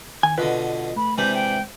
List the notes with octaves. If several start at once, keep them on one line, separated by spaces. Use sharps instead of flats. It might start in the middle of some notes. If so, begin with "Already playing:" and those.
D#3 G#5
B2 D3 F4 B4 D#5
A3 B5
C3 E3 G#3 D4 G6
G5